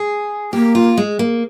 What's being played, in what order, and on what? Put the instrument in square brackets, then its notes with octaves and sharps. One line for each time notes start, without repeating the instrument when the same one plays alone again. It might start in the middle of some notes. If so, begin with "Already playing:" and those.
Already playing: [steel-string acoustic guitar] G#4
[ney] A#3 [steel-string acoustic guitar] G4
[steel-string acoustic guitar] F4
G#3
A#3